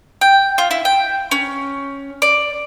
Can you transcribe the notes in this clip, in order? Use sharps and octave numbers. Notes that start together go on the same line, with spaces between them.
G5
F4
E4
G5
C#4
D5